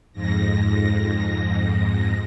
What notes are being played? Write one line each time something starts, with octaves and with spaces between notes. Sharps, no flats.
F2 G#2 A#6